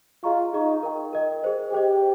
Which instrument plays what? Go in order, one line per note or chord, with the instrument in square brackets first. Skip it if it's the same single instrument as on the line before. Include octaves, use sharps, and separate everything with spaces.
[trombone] F4 [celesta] G#4 D#5 A#5 C#6
[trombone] D#4 [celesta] G#4 D#5 A#5 C#6
[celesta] A#4 D#5 G5
A#4 D#5 G5
G#4 C5 D#5
[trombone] G4 [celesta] G#4 C5 D#5